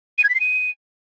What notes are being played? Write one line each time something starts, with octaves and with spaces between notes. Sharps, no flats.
D#7
G#6
B6
C7
D#7